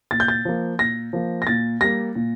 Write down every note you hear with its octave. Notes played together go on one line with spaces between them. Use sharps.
A#2 A6
G6
A6
F3 A#3
A#2 A#6
F3 A#3
A#6
A#2 A6
G3 A#3 A#6
A#2